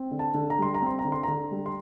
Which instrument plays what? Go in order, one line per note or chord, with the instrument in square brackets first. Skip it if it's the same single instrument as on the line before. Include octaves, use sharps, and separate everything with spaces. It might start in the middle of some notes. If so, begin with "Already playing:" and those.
Already playing: [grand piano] C4
D3
A5
D3
A#5
G3 C6
A#5
C4 C6
A#5
D3
C6
D3 A#5
G3
C6